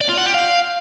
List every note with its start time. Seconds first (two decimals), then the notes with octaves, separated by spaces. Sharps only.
0.01 D5
0.09 F4
0.18 F#5
0.26 G4
0.34 F5